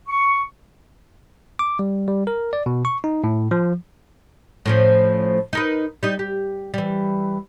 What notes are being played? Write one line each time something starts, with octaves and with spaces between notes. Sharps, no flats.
C#6
D6
G3
G3
A#4
D5
B2
C#6
D#4
A2
F3
A2 F3 C#4
D#4 A#4 B4
G3 D#4
G4
E3 G3